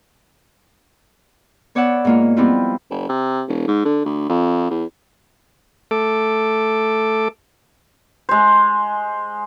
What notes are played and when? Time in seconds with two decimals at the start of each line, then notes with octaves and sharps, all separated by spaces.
1.75 B3 C#5 D5 E5 F#5
2.05 G#2 A#3 F4
2.36 F3 G3 B3 C4 E4 F4
2.90 F#1
3.09 C3
3.48 E1
3.68 G#2
3.85 D3
4.05 D2
4.29 F2
4.71 E2
5.91 A3 A4 D6
8.29 G#3 C5